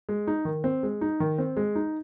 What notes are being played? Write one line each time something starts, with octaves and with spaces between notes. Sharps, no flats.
G#3
D#4
D#3
C4
G#3
D#4
D#3
C4
G#3
D#4